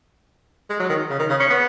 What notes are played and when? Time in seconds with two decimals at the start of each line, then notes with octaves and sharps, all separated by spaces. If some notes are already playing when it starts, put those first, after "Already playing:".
0.70 G#3
0.80 F#3
0.90 D#3
1.10 C#3
1.19 D#3
1.30 C#3
1.40 C#4
1.50 B3